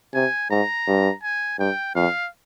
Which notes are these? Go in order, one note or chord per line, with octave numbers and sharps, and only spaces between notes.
C3 G#5
G#2 A#5
G2
G#5
G2 G5
F2 F5